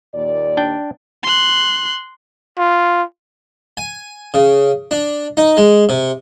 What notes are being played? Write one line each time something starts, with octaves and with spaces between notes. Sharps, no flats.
D#2 A#2 D5
D4 G5
C6 F#6
F4
G#5
C#3
D4
D#4
G#3
C3